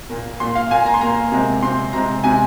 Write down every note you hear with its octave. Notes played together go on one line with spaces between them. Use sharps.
A#2 A#3
A#2 A#3 C6
F5
A#2 A#3 G#5
A#5
C6
A#2 A#3 A#5
C3 G#3 C4
C3 G#3 C4 C6
C3 G#3 C4 A#5
C3 G#3 C4 G#5